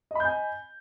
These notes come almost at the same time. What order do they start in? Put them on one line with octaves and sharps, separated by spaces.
D#5 B5 G6 G#5